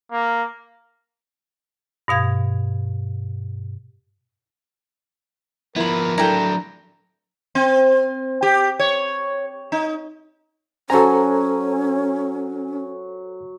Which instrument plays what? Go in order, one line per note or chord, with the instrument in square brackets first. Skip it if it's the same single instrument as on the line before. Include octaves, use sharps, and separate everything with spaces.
[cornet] A#3
[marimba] G2 B2 F5 G#6
[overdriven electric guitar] F3 B3 [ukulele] E4 B5 [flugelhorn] A#4
[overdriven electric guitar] F#3 D4 [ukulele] E4 A4 [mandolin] G5 A#5
[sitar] C4
G4
C#5
D#4
[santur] F#3 G#5 [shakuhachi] C#4 [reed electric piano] A4 C5 A#5